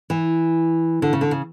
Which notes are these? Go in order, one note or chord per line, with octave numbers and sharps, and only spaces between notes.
E3
D3
C#3
D3
C#3